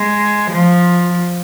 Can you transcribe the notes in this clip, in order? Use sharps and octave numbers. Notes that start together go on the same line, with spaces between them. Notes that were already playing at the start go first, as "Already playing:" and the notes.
Already playing: G#3
F3